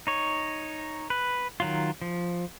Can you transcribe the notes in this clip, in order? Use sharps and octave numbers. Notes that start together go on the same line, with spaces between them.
D#4 C#5
B4
D#3 F#3 F4
F3